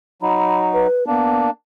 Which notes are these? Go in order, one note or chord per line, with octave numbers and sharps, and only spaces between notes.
F#3 D#4 B5
B4
A#3 B3 D4